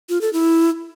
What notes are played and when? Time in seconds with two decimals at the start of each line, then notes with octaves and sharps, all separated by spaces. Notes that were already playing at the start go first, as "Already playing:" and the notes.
0.09 F4
0.21 A4
0.33 E4